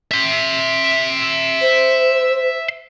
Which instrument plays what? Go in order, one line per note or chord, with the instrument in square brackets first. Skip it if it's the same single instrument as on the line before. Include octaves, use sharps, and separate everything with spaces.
[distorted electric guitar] E5 C6
[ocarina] C5